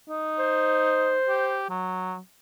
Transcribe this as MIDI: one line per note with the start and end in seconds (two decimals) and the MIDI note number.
0.09 1.16 63
0.38 1.62 72
1.28 1.66 67
1.70 2.18 54